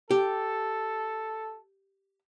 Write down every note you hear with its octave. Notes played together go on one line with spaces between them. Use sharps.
G4 A4